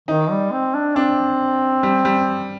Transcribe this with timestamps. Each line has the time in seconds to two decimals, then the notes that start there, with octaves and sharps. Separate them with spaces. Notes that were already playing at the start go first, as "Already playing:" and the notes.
0.08 D#3 D#4
0.31 G3
0.52 C4
0.74 D4
0.95 C4 D4
1.83 G3
2.05 G3